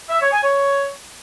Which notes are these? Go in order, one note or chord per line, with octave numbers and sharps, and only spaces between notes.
E5
C#5
G#5
C#5